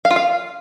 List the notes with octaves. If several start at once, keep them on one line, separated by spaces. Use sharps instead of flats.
F5
F4
F5